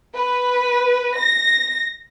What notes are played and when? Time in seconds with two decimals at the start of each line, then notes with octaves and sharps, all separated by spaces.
0.15 B4
1.15 A#6